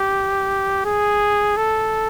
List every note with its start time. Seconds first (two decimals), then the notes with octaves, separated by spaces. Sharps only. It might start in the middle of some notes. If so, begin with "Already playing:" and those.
Already playing: G4
0.85 G#4
1.57 A4